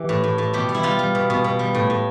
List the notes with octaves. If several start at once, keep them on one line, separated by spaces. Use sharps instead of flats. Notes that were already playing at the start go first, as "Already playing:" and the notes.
Already playing: E3 G4
A2
A2
A2
B2 G4
G3
E4
G3 F4
G3
B2
B2
B2
G3
A2
A2